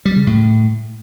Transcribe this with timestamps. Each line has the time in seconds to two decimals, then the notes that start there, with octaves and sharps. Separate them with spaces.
0.05 G3
0.16 C#3
0.27 A2